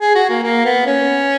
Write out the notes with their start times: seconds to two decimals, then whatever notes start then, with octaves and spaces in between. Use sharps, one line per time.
0.01 G#4
0.15 F#4
0.30 A#3
0.43 A#3
0.65 B3
0.86 C#4